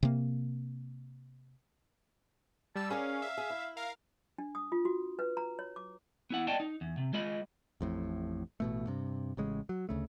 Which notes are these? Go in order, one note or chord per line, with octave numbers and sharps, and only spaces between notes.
C3 A#3
G3 A5 E6
C#4 G#4 A#4 D5 F5
E5
G#4
E4
A#4 F5
D4
D#6
F4
F#4
B4
A#5
C#5
D6
B3 E4 F#5
D5 D#5 G5 A5
D#4
E2
C3
G#3 F4 D#5 B5
A1 F2 A2
A1 B2 A3
G2 C3
A1 C#3 G#3
F#3
D2 C#3 A3